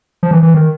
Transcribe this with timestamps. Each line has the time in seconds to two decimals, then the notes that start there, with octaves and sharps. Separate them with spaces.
0.23 F3
0.31 E3
0.43 E3
0.54 D#3